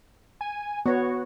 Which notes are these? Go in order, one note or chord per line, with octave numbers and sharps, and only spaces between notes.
G#5
B3 F#4 C#5